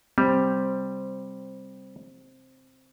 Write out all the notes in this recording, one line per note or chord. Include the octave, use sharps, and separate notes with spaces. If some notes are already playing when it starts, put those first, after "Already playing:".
G3 C4